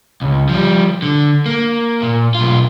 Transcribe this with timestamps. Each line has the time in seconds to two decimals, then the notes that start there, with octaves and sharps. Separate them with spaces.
0.22 C#2
0.49 F3 G3
1.02 D3
1.46 A#3
2.02 A#2
2.35 B1 F4